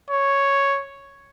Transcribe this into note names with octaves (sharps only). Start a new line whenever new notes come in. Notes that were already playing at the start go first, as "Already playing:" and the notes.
C#5